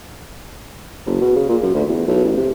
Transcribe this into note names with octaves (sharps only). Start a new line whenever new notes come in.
F#1
B2
C#3
A#2
F#2
D2
E2
B1
A1
C3